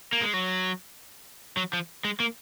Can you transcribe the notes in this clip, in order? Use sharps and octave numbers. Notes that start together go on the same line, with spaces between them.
A#3
G#3
F#3
F#3
F3
G#3
A#3